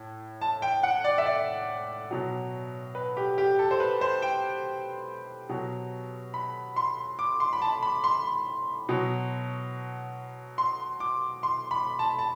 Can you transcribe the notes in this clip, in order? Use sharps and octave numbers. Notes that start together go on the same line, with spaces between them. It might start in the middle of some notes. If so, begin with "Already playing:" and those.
Already playing: A2
A5
G5
F#5
D5
E5
D5
B2 F#3
B4
G4
G4
A4
C5
B4
C5
G5
B2 F#3
B5
C6
D6
C6
B5
A5
B5
C6
B2 F#3
C6
D6
C6
B5
A5
A5